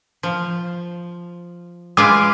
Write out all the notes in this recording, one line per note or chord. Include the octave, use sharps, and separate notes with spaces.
F3
G#3 F4 B4 D6